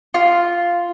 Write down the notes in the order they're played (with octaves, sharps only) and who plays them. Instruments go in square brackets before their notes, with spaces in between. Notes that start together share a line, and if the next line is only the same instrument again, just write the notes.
[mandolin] F4